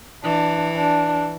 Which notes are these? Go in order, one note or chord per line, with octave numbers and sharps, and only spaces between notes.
E3 D4
D4